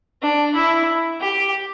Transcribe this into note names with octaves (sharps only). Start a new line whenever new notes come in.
D4
E4
G4